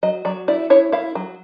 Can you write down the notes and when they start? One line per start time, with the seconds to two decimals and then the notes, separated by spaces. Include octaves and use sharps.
0.03 F#3 D#5
0.25 F#3 D5
0.48 E4 D5
0.70 E4 C#5
0.92 E4 F5
1.15 F#3